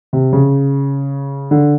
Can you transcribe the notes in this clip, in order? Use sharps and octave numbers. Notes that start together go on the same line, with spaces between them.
C3
C#3
D3